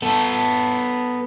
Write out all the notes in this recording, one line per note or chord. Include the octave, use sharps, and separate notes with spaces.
B3 A4